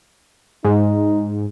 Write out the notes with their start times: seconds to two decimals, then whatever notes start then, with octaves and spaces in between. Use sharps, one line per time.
0.65 G#2 D#4